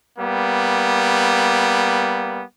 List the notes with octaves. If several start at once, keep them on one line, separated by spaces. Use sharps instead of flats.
G3 A#3 B3